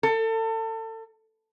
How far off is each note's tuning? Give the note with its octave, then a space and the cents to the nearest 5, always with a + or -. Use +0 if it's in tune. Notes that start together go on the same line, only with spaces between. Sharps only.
A4 +30